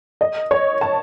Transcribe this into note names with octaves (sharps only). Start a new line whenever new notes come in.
D#5
C#5
A5